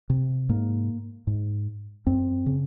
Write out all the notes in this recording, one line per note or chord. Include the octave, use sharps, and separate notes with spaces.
C3
G#2 A#3
G#2
F#2 C4
C#3